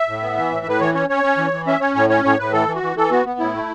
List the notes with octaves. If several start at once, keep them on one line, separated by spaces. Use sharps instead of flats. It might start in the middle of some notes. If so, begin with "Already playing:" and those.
Already playing: E5
A2
B3
E3
A2
A2 B4
E3 C#5
C#4 C#5
C#4 C#5
C#4
E3
E3
C#4 E5
C#4 C#5
A2 C#5
C#4 C#5
A2 C#5
A2 B4
E3 A4
E3
F#4
E3
E3 A4
B3 F#4
B3
A2 E4
A3